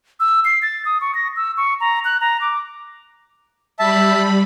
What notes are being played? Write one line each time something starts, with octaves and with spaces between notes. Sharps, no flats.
E6
C7
A6
D#6
C#6
A#6
E6
C#6
A#5
F#6
A#5
D6
G3 E5 A5 B5